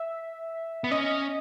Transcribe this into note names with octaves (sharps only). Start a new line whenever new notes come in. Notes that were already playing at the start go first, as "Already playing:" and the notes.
Already playing: E5
B3
C#4 D#5